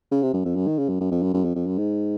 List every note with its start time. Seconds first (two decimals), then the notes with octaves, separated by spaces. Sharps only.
0.11 C#3
0.23 C3
0.34 F#2
0.45 F2
0.56 F#2
0.67 D#3
0.78 C#3
0.89 F#2
1.00 F#2
1.11 F2
1.22 F#2
1.34 F#2
1.44 F2
1.55 F2
1.67 F#2
1.78 G#2